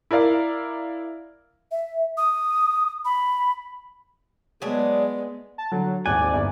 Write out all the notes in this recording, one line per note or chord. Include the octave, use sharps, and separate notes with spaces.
E4 A#4 D5 F5
E5
D#6
B5
F#3 G#3 B3 D4 G#4
A5
D3 F#3
D#1 G#1 D5 G#5 F#6
G1